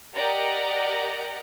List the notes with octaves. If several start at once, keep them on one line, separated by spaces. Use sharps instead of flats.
G4 A#4 D5 D#5 F#5 A#5